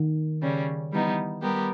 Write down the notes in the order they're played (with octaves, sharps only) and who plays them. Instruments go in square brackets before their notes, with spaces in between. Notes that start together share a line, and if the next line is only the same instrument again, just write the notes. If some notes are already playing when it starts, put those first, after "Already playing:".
Already playing: [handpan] D#3
[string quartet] C#3 G3 C#4
E3 G3 B3 D#4
G3 B3 G4 A#4